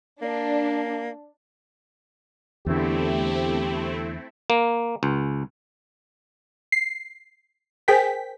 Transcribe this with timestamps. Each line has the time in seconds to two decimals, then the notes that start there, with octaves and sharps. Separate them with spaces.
0.22 A#3 D4
2.66 E2 D3 A3 C4 E4 G4
4.50 A#3
5.03 C#2
6.72 C7
7.88 G#4 A#4 C5 G5 G#5 B6